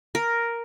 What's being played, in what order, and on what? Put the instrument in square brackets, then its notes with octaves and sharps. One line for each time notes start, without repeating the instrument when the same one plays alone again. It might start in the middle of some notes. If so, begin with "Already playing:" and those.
[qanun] A#4